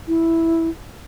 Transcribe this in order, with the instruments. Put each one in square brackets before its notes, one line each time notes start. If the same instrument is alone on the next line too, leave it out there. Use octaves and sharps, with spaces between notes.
[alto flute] E4